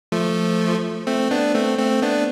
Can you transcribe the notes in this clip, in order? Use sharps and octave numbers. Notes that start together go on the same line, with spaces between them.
F3 A3
A3 C4
B3 D4
A3 C4
A3 C4
B3 D4